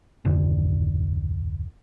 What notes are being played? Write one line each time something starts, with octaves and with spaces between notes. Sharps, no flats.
D1 G#1 F2 D3